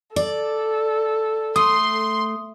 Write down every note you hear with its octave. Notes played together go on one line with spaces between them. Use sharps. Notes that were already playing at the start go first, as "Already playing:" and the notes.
A4 D5
A3 C6 D#6